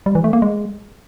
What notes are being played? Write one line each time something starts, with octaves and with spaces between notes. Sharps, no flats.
G3
E3
A3
A#3
G#3